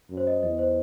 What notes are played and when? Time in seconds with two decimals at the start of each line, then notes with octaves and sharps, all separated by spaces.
0.10 F#2
0.17 C5
0.27 D#5
0.43 E2 D#5
0.59 C5